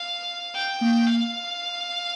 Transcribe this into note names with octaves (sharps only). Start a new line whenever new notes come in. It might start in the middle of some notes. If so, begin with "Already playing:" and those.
Already playing: F5
G5
A#3
F5